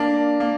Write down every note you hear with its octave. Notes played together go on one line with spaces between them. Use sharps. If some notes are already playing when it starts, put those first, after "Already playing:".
Already playing: A#3 D4
A#3